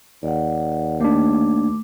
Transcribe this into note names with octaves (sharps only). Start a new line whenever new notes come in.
D#2 D5 F#5
A3 A#3 D4 D6